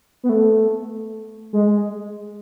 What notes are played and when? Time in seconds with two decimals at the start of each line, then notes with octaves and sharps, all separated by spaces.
0.23 B3
0.29 A3
1.53 G#3